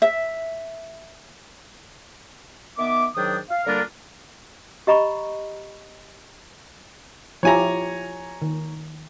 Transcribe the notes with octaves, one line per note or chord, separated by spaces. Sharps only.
E5
D#3 B3 E5 D6
G#2 D#3 F#3 D4 G5 D#6
F5
D3 G3 A#3 D4 F4 A#4
G4 D#5 A#5 B5 C#6
F3 E4 G4 C#5 G#5 A#5
D#3